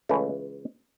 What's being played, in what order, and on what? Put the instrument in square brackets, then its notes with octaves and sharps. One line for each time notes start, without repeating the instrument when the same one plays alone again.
[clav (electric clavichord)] C#2 C#3 E3 A3